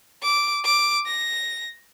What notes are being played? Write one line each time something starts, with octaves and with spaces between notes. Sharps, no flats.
D6
D6
A#6